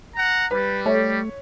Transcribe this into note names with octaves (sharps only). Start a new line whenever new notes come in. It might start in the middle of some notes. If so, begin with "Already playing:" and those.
F#5 A#5
G3 B4
A3 C#5